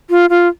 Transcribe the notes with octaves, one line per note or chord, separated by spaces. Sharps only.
F4
F4